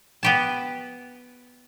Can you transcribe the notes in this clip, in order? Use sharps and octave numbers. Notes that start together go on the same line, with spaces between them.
B3 G4 A5